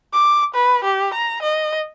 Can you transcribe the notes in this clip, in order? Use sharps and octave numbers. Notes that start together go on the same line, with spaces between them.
D6
B4
G4
A#5
D#5